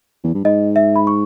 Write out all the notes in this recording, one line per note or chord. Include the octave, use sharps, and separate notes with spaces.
E2
G2
G#2 D#5
E5
B5
C#6